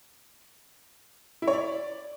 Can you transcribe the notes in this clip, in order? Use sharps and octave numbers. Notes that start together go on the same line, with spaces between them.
E4
C#5
D5